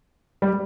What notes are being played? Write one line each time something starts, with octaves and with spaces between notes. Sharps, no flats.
G3